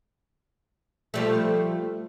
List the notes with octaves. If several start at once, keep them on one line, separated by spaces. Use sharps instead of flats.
F3 G3 A3